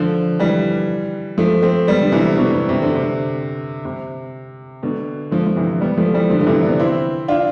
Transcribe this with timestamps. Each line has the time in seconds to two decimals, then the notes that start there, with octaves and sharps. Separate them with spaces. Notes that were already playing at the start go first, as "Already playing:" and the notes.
Already playing: D3 F3
0.39 E3 G3
1.38 F3 A3
1.62 A3 C4
1.87 G3 B3
2.01 D3
2.12 C3 E3
2.37 B2 D3
2.53 C3
2.69 C3
2.82 D3
2.95 C3
3.85 C3
4.83 B2 D3
5.31 D3 F3
5.47 F3
5.56 C3 E3
5.81 G3 B3
5.98 F3 A3
6.14 E3 G3
6.30 D3 F3
6.40 D3
6.46 C3 E3
6.63 B3 D4
6.80 C4 E4
7.28 D4 F4